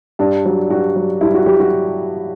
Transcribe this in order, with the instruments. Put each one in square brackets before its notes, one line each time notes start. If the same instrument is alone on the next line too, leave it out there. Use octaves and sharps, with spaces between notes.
[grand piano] G2 D4
F#3
G2 F#4
F#3
G2 E4
F#4
F#3 G4
F#4